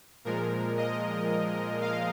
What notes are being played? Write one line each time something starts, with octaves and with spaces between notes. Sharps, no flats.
A#2 F3 G#3 A#4
D#5
F5